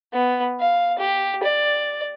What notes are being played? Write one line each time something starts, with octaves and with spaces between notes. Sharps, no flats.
B3
F5
G4
D5